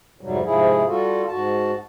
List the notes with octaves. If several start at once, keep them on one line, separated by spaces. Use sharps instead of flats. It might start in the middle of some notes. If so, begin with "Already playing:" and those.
F2 G#2 C3 F#3 G3
G#2 C3 F3 E4 G#4
G3 F4 F#4 A4
G#2 F#4 A5